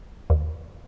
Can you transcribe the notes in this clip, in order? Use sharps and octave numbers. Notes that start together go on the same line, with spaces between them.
D#2